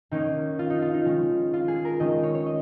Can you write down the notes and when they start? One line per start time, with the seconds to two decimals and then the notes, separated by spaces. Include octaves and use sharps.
0.11 D#3 A#3 C#4 D#4
0.59 F4
0.70 D#4
0.82 F4
0.94 D#4
1.05 D#3 G#3 C#4
1.53 F4
1.68 G#4
1.85 A#4
2.00 D#3 G#3 C#4 D#5
2.23 C#5
2.34 C#5
2.46 D#5